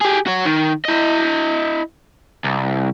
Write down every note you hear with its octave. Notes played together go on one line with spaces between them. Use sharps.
G4 G#4
F#4 C#5
D#3
E4 D#5
C2